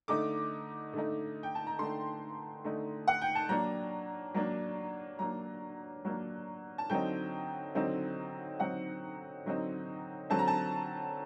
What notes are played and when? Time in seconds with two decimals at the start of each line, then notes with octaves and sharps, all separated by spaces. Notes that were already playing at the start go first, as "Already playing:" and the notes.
0.08 D3 A3 D#4 D6
0.93 D3 A3 D#4
1.43 G5
1.55 A5
1.67 A#5
1.79 D3 A3 D#4 C6
2.64 D3 A3 D#4
3.08 F#5
3.22 G5
3.35 A5
3.49 F#3 A#3 D4 A#5
4.34 F#3 A#3 D4
5.19 F#3 A#3 D4 A#5
6.05 F#3 A#3 D4
6.78 A5
6.90 D3 F#3 C4 D#4 G5
7.75 D3 F#3 C4 D#4
8.59 D3 F#3 C4 D#4 F#5
9.45 D3 F#3 C4 D#4
10.30 D3 F#3 C4 A5
10.39 A#5
10.48 A5